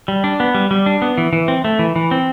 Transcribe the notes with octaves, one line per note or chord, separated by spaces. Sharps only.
G3
D4
B3
G3
G3
D4
B3
E3
E3
C4
A3
E3
E3
C4